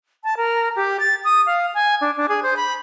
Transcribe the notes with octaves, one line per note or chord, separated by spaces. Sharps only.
A5
A#4
G4
A6
D#6
F5
G#5
D4
D4
G#4
C5
B5